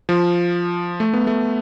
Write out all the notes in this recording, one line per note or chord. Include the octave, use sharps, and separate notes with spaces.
F3
A3
B3
A3